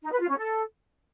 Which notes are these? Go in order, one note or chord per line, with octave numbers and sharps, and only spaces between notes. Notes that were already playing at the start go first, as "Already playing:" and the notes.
D#4
B4
F4
C#4
A4